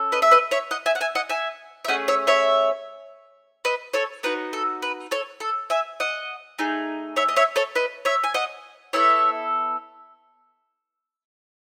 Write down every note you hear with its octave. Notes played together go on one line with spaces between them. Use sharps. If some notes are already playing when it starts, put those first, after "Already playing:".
Already playing: C#4 A4
B4 D#5
E5
B4 D#5
C#5 E5
D#5 F#5
E5 G#5
F#5
E5 G#5
D#5 F#5
E5 G#5
E5
A3 C#4 G#4 D#5 F#5
C#5 E5
C#5 E5
B4 D#5
A4 C#5
B3 D#4 F#4 B4
A4
B4
A4 C#5
A4
E5 G#5
D#5 F#5
A3 D#4 G#4
C#5 E5
D#5
C#5 E5
A4 C#5
B4 D#5
C#5 E5
G#5
D#5 F#5
B3 E4 A4 C#5 E5